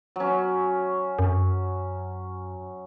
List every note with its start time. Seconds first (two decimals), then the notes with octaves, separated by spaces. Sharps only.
0.16 F#3 C#4
1.19 F#2